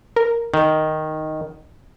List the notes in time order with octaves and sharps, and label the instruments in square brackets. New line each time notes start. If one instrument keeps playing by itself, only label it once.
[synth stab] A#4
[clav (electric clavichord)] D#3